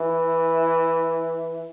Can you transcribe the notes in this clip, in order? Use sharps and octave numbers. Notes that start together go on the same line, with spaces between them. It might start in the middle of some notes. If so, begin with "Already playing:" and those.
Already playing: E3